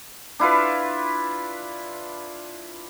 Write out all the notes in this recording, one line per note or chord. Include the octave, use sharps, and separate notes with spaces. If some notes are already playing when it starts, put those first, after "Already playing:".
D4 E4 F4 B4